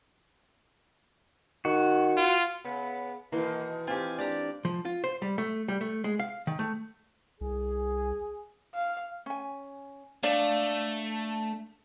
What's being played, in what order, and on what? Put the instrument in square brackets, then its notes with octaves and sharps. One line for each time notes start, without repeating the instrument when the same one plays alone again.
[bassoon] D#3 [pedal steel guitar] F#4
[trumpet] F4
[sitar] C#3 [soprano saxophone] B3
[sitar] B2 D#3 [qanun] E3 C6 [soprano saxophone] A#3
[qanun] C4 [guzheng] F4 G4 [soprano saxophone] G#5
[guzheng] D4 G4 A#5 [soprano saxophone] D5
[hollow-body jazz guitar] F3
F4
C5
G3
A3
G3
A3
G#3
F5
D#3
A3
[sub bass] C2 [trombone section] G#4
[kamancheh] F5
[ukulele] C#4 G#5
[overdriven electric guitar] A3 [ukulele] D4 D5 F5